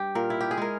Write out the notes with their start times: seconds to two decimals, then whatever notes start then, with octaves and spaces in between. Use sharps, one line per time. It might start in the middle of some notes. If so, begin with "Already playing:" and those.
Already playing: G2 G3 G4
0.15 A#2 A#4
0.30 E4
0.40 G4
0.51 G#4
0.57 G#3 A#4